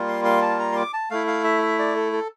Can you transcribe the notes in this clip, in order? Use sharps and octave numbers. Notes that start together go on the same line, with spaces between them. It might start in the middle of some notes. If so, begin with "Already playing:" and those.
Already playing: G3 A#3 F4
C6
C6
A5
A#5
C6
D6
A5
A3 E4 F5
F5
E5
E5
D5
A4
A4